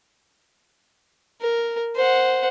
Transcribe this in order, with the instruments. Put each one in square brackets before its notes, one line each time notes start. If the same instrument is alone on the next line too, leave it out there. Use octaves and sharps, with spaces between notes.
[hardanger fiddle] A#4
C5 F#5